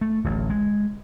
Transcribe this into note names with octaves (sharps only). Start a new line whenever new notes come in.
A3
D1 A1
G#3